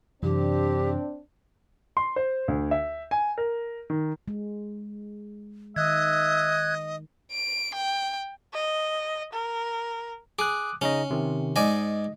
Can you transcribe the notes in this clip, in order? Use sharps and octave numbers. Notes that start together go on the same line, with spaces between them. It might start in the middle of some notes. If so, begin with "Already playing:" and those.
F#2 C3 E3 C4 D4 G4
C6
C5
D2
E5
G#5
A#4
D#3
G#3
D#3 D#5 E5 F#6 G#6
D7
G5
D#5
A#4
G#4 D6 D#6 F#6
C#3 C#4 D#4 D#5
C3 D#3
G#2 D5 D#5 G#5